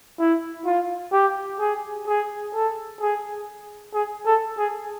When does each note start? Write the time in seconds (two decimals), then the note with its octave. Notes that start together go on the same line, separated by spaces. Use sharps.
0.19 E4
0.66 F4
1.13 G4
1.59 G#4
2.07 G#4
2.53 A4
3.01 G#4
3.94 G#4
4.26 A4
4.58 G#4